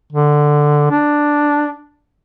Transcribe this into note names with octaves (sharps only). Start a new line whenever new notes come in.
D3
D4